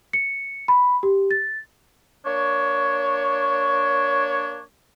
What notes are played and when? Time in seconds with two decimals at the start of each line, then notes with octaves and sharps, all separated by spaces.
0.13 C#7
0.68 B5
1.03 G4
1.31 A6
2.26 A#3 D4 C#5